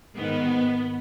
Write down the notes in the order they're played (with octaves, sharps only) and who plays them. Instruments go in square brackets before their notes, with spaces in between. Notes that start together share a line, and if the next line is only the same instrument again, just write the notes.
[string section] G#2 D#3 B3